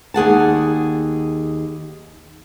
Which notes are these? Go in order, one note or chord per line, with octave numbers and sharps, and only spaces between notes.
D#2 G#4 F#5 A5